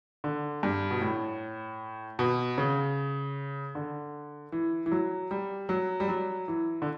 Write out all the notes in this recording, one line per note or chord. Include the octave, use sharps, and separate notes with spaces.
D3
G2
B2
A2
B2
C#3
D3
E3
E3
F#3
G3
F#3
G3
F#3
E3
D3